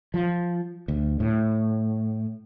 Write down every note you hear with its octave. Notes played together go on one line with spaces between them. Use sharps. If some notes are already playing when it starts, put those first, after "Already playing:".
F3
D2
A2